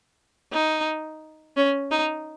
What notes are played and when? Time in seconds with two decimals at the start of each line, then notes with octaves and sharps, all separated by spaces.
0.53 D#4
1.56 C#4
1.91 D#4